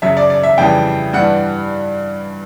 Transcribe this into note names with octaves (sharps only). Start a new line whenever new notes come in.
F#2 C#3 F#3 E5
D5
D5
E5
F2 C#3 E3 G3 G5
G2 E3 G3 F#5